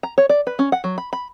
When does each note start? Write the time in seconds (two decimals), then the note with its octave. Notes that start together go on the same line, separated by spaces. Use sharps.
0.03 A#5
0.18 C#5
0.29 D5
0.47 B4
0.59 C#4
0.72 F#5
0.84 F#3
0.98 B5
1.13 B5